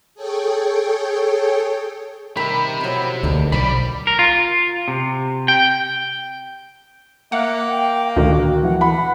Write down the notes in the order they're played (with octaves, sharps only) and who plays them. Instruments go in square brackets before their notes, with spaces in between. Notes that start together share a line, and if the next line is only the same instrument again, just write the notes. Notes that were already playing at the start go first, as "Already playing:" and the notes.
[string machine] G#4 A4 C#5 G5
[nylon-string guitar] D#3 G3 A#4 [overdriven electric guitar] G4 E5 [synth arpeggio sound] B5
[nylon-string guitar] F3 F#3 E4
[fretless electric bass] D2 [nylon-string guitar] D3 D#3 A#3
[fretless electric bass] B1 [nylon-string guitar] F3 [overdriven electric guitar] G3 D5 [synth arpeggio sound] B5
[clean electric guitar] A#4
F4
C3
G5
[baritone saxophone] A#3 [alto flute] E5 [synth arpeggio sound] F#5
[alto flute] G5
[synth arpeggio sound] D2 A#2 D#3 [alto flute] F#4
[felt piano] E3 [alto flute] F#5
[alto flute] F#5 [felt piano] B5